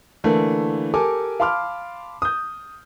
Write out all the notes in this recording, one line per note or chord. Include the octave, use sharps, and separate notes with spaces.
D3 E3 A3 A#3
G4 A4 A#4 G#5 D6
F5 A5 B5 C6 D6 F6
D#6 G6